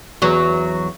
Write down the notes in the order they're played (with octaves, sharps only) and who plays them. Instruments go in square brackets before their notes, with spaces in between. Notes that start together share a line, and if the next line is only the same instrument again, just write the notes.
[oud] E2 F#3